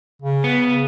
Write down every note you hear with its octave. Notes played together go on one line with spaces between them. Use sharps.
C#3
B3